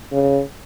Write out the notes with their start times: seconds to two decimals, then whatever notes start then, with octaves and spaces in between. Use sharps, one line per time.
0.12 C#3